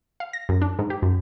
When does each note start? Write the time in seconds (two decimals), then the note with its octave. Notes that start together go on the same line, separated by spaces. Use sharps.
0.20 F5
0.33 A#6
0.49 F#2
0.62 D4
0.79 G#2
0.90 G4
1.02 F#2